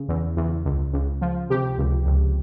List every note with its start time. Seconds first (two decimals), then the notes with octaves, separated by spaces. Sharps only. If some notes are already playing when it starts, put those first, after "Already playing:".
Already playing: C#3
0.08 E2
0.37 E2
0.65 C#2
0.93 C#2
1.21 F3
1.50 C3 G4
1.78 C#2
2.06 C#2